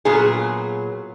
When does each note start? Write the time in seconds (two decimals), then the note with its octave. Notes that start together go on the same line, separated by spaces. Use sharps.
0.05 A#2 F#3 B3 G#4